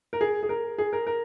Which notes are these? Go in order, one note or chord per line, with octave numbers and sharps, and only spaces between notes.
A#4
G#4
G#4
A#4
G#4
A#4
A#4